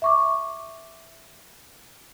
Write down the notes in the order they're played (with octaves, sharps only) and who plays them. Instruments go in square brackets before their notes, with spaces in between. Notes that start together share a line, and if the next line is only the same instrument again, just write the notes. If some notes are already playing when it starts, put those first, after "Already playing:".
[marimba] E5 C#6 D6